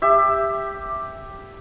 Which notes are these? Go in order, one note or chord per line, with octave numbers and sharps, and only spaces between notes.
G4 E5